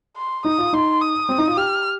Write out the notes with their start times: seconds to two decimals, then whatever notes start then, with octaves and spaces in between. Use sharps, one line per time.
0.17 C6
0.45 D#4 D#6
0.58 F4
0.73 D#4 C6
1.01 D#6
1.29 C4
1.38 D#4
1.48 F4
1.57 G4 F6